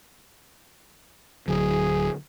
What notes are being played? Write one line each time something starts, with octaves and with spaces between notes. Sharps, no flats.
D1 D3 F#3 G#4